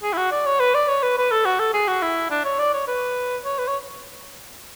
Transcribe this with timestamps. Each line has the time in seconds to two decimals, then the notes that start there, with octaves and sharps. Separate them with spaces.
0.03 G#4
0.13 E4
0.17 F#4
0.31 D5
0.46 C#5
0.60 B4
0.75 D5
0.88 C#5
1.03 B4
1.17 B4
1.31 A4
1.45 F#4
1.59 A4
1.74 G#4
1.88 F#4
2.02 E4
2.30 D4
2.44 C#5
2.59 D5
2.73 C#5
2.88 B4
3.45 C#5
3.59 B4
3.67 C#5